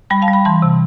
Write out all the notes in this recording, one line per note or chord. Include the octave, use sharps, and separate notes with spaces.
G3 G5 B5
F5 A5
G3
G5 B5
E3 A5 C6
C3